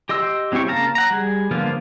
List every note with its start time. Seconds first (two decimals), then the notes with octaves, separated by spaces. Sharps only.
0.09 G4 D#5 C6 E6
0.52 F#3 C4 E4 G4 C#6
0.67 C#3 A#3 F5 A5 A#5
0.95 F#5 A#5
1.11 G3 G#4
1.51 D3 F3 A#3 B3 F4